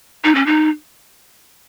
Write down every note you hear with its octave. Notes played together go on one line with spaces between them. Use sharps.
D#4
C#4
D#4